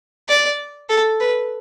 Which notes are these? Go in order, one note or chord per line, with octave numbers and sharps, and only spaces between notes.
D5
A4
B4